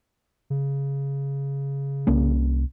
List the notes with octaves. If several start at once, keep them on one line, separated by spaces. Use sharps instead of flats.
C#3
C2 A#3 C#4